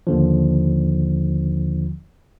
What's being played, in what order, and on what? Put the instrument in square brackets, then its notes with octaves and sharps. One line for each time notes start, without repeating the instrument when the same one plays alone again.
[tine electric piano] D#2 D3 F3